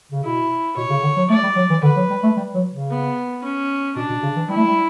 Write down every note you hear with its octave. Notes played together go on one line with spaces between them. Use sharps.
C#3
B2 E4
B2 C#5
C#3
D3
F#3
A3 D5
G3
F#3
E3
D3 B4
F#3
G3
A3
G3
F#3
C#3
B3
C#4
B2 D4
B2
C#3
E3
G3 E4
A3
G3